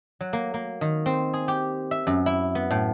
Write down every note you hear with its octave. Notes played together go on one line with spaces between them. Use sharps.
F#3
A#3
A#3
D#3
C4
G#4
G4
E5
F#2
E4
B3
A2